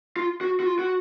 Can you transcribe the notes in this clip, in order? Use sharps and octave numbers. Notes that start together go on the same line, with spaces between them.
F4
F#4
F#4
F4
F#4